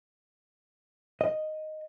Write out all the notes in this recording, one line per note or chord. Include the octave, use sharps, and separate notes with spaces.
D#5